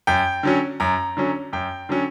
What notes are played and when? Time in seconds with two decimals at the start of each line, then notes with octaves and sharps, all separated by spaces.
0.07 F#2 G5
0.43 D3 F#3 C#4
0.80 F#2 A#5
1.17 D3 F#3 C#4
1.53 F#2 G5
1.89 D3 F#3 C#4